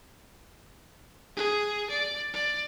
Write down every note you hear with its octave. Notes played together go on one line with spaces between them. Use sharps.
G#4
D5
D5